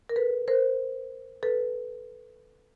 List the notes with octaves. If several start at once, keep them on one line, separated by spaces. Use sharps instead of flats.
A#4
A4 B4
A#4 C5
A4 B4